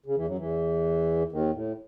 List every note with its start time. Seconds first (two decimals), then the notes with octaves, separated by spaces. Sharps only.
0.06 C#3
0.17 E2 E3
0.27 F#2 F#3
0.38 E2 E3
1.32 D#2 D#3
1.53 A2